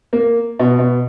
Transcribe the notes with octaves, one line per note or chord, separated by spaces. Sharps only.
A#3
B2
B2